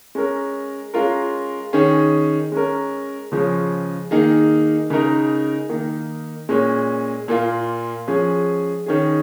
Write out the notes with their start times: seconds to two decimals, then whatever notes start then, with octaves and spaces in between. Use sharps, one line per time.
0.15 G#3 C#4 A#4
0.94 G#3 C#4 F4 A#4
1.73 D#3 C#4 G#4
2.52 G#3 C#4 A#4
3.32 C#3 F3 G#3 C#4
4.11 D#3 A#3 D#4 G#4
4.90 C#3 G#3 D#4 A#4
5.69 D#3 A#3 D#4
6.49 A#2 G#3 C#4
7.28 A#2 A#3 F4
8.07 F3 G#3 C#4 G#4
8.86 D#3 C#4 G#4